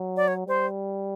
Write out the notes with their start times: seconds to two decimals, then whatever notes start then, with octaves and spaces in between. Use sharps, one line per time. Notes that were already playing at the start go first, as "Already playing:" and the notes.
Already playing: F#3
0.17 D5
0.28 C#5
0.47 G3 C5